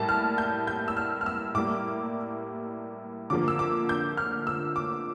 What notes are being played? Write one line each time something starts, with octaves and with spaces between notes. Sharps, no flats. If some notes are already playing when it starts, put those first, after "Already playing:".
Already playing: A2 G3 A#3 A5
F6
G6
G6
E6
F6
F6
E6
A2 G3 A#3 D6
D3 F3 A#3 D6
E6
D6
G6
F6
E6
D6